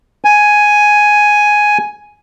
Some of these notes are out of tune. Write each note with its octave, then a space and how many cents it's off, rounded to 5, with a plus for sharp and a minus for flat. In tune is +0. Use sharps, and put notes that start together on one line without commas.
G#5 +5